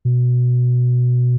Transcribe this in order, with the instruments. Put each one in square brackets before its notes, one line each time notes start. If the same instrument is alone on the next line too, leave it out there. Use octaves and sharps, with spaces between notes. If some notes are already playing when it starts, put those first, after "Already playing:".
[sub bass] B2